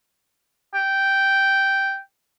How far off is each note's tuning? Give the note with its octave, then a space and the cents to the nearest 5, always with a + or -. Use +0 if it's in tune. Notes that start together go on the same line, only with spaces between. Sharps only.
G5 -5